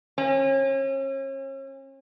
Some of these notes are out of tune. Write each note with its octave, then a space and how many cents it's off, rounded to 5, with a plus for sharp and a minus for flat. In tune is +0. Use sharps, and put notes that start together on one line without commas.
C#4 -40